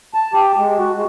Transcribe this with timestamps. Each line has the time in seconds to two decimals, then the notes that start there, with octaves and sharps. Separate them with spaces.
0.14 A5
0.34 G4
0.57 G#3
0.78 F#4
0.95 G#3